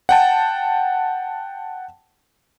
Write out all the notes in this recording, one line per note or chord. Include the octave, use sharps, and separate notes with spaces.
F#5 G5 A5